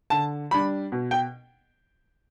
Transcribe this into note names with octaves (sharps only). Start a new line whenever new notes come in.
D3 A5
G3 D4 B5
B2
G5